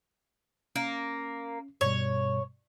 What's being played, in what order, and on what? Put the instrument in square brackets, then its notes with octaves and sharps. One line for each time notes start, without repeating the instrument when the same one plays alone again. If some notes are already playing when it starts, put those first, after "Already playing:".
[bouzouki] A#3 [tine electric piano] C#4
[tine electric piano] G2 B2 G3 [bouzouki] C#5